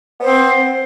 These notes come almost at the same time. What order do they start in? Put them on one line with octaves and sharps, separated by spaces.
B3 C5 C4